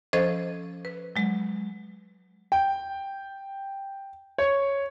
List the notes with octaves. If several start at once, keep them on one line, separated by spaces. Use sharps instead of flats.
F3 C#4 A4 C5 D#5 G#6
B4
F#3 G#3
G5
C#5